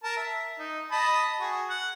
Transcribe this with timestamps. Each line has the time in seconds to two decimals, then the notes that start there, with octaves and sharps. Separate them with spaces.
0.04 A#4 A5
0.17 E5
0.59 D#4
0.91 D#5 A5 B5
1.40 F#4 G#4
1.70 F#5